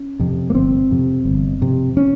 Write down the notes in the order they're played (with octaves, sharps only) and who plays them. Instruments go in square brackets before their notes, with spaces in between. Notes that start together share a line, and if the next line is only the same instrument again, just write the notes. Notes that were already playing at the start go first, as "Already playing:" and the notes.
Already playing: [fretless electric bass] C#4
F2 C3
A#3
G1 C4
F2 C3
G1
F2 C3
C#4